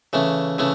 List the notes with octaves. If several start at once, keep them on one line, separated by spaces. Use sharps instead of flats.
C#3 E3 A3
C#3 E3 A3